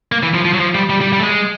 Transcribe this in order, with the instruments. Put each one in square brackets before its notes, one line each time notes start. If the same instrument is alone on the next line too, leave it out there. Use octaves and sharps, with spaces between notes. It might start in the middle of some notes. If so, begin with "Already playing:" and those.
[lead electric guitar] A#3
E3
F3
F3
F#3
F3
G3
G3
G3
G3
A3
G#3